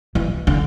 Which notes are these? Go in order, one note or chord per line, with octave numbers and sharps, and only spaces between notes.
E3
D3